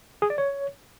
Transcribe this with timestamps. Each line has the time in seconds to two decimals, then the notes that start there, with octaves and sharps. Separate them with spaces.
0.22 G#4
0.30 D5
0.38 C#5